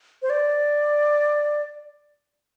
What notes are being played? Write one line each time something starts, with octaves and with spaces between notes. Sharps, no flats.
C5
D5